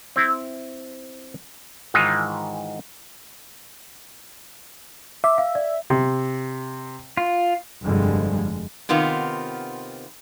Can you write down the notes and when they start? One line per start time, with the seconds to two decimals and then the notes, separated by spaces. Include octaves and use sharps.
0.16 C4 E4
1.94 G#2 D#3 E3 G#3 D#4 F4
5.24 E5 D6
5.38 F5
5.55 D5
5.90 C3
7.17 F4
7.82 F1 G2 D3 F3 G3 G#3
8.89 C3 D#3 B3 F4